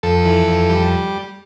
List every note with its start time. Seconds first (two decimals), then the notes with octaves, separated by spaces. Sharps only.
0.03 F2 A4
0.25 E3
0.47 F2
0.69 G3